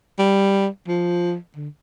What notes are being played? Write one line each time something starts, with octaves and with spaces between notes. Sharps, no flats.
G3
F3
D3